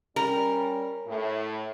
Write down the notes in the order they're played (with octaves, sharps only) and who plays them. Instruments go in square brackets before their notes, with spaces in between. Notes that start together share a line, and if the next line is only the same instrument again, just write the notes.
[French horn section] G3 C#4 [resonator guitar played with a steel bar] A#4
[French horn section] A2